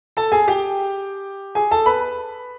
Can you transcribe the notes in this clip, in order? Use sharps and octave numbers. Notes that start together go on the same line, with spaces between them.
A4 A5
G#4 G#5
G4 G5
G#4 G#5
A4 A5
B4 B5